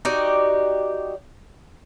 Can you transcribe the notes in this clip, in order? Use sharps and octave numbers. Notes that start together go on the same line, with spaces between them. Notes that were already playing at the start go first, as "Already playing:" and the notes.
D#4 F#4 G4 D5